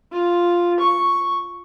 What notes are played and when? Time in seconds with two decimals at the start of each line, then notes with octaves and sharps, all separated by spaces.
0.12 F4
0.80 C#6